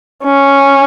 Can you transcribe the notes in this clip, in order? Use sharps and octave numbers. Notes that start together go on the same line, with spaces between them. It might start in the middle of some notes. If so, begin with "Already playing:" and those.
C#4